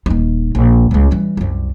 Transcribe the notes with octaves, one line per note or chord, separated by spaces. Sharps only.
D#1 D#4
A#1
C#2 G#3
E3 G3
C2 F#2